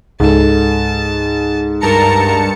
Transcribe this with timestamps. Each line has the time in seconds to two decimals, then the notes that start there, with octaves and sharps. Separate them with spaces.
0.20 C#2 G#2 A4 A5
1.81 G2 A#4 A5 A#5 C#7